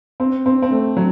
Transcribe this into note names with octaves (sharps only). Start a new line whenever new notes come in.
C4
C4
C4
A3
F#3